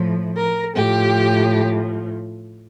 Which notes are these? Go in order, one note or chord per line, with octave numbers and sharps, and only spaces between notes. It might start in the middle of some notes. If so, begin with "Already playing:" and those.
Already playing: A2 F3
A#4
A2 F3 G4